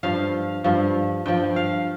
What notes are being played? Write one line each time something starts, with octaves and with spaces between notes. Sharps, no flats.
G2 F3 F5
G2 F3
G2 F3 G5
F5